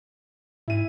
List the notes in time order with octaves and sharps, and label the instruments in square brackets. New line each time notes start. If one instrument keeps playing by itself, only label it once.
[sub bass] G#2 [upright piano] E4 D#7